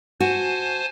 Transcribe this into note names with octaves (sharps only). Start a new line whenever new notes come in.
F#4 C5 G#5 A5